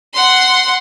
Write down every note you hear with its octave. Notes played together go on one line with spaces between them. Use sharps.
F#5 C6